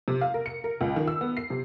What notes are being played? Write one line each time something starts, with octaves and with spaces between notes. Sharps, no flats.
C3
F5
A#4
C#7
A#4
C#2
D#3
E6
B3
C7
C3